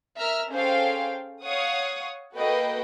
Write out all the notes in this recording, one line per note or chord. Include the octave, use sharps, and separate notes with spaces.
A#4 E5 A#5 F6
C#4 G#4 A4 C5 F5 G5
C#5 F5 F#5 C#6 D#6
A#3 F#4 A4 B4 D#5 G5